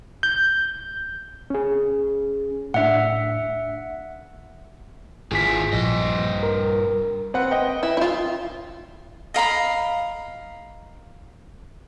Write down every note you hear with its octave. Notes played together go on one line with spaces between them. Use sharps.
G6
C#4 G#4
A2 D4 E5 F#5
G#1 E4 F4 G#4 B6
A#1 G2 D#5
A#4
C4 B4 F#5
B4 D#5 G5
E4
E4 F4
D#5 F5 A#5 B5